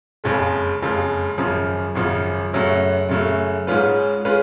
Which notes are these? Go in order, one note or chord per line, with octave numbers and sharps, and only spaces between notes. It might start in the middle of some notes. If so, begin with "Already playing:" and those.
F#1 F2 C#3 G#3
F#1 F2 C#3 G#3
G#1 F#2 C#3 F3
G#1 F#2 C#3 F3
F#2 C#3 F#3 A3
F#2 C#3 F#3 A3
G#2 G#3 C#4 F4 B4
G#3 C#4 F4 B4